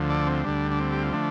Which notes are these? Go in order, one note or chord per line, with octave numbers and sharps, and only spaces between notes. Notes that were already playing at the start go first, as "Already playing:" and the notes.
Already playing: D2 D3 F3
A4 D5
C4
D2 D3 G3 D4
D4
C4
G4
F4
D3 F3 A3 D4